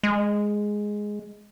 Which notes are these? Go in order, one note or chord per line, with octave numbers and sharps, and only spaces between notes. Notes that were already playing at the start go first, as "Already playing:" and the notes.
G#3